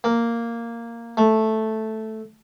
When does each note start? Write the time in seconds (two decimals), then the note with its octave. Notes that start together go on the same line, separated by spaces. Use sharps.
0.04 A#3
1.17 A3